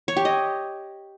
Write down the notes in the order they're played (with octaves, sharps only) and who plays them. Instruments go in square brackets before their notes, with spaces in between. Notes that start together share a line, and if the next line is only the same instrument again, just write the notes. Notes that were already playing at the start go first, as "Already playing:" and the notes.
[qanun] C#5
G4
D#5